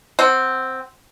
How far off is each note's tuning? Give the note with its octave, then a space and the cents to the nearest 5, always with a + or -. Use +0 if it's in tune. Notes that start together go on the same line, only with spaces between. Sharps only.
C4 +0 F#5 +25